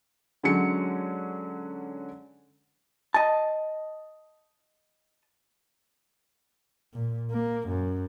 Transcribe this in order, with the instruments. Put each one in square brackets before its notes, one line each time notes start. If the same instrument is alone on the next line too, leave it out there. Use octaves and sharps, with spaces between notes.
[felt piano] D3 F#3 G#3 C#4 C#7
[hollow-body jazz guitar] D#5 A5
[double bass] A#2
A#3
F#2